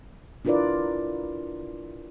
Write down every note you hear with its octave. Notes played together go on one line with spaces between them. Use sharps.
D4 E4 F4 A#4 B4 D5